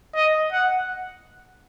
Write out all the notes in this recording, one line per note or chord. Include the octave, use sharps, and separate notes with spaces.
D#5
F#5